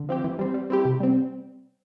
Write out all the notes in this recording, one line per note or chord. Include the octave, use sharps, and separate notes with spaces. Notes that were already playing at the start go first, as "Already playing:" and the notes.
Already playing: D3
F3 C4 G4
E3
G3 C4
G3
C4 E4 G4
C3
G3 C4